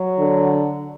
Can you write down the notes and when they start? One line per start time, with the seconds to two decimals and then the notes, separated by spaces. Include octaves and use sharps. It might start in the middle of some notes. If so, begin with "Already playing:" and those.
Already playing: F#3
0.19 D3